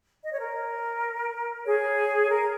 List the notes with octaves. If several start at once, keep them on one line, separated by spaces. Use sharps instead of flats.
D#5
C#5
A#4
G#4 C#5
A#4